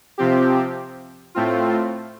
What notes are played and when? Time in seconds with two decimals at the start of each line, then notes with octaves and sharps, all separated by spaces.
0.18 C3 F3 C4 G4
1.35 A2 A3 C4 F4